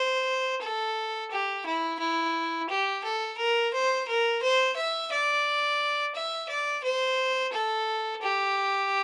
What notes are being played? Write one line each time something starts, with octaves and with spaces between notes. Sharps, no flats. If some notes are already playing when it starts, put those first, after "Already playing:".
Already playing: C5
A4
G4
E4
E4
G4
A4
A#4
C5
A#4
C5
E5
D5
E5
D5
C5
A4
G4